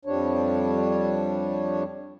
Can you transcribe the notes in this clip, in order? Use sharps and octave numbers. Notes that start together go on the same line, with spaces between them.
F2 F3 G3 D4 C#5